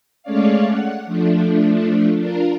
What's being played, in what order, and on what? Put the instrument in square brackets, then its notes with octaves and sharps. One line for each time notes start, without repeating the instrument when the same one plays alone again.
[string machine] G#3 A3 C#4 C#5 D5 F5
F#5
F3 A3 D4
D4 F4 A#4